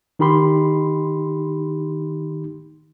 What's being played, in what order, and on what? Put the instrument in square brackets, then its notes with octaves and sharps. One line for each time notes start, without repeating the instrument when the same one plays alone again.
[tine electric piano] D#3 D#4 G4 B5 C6